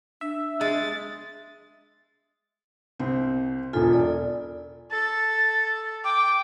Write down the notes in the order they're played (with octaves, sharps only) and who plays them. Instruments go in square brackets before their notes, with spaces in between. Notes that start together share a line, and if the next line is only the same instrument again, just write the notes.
[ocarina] D4 [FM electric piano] E5
[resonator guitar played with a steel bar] G#3 [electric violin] A6
[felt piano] C2 C4
[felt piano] E1 B1 G#5 [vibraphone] F4 A4
[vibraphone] D5
[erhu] A4 [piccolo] A6
[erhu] G5 [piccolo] D6